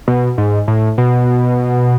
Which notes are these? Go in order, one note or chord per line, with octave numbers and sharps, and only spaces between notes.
B2
G#2
A2
B2